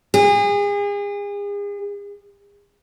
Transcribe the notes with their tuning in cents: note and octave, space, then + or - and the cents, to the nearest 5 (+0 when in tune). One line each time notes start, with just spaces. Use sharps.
G#4 -35